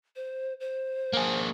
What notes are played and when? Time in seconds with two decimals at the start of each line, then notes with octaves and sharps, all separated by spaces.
0.16 C5
0.60 C5
1.13 A#3 G#4